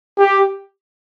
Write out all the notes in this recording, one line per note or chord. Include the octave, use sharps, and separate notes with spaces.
G4